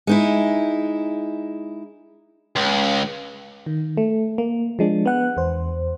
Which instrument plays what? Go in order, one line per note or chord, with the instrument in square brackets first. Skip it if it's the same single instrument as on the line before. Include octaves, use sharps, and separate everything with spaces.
[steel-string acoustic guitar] G#3 D#4 E4
[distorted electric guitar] C#2
[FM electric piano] D#3
A3
A#3
F3 G#3 D4
B3 F#5 F#6
E2 C5